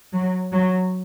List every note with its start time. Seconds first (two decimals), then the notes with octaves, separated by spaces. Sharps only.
0.14 F#3
0.52 F#3